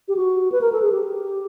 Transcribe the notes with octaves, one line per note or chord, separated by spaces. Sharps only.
G4
F#4
B4
A#4
A4
G#4
G4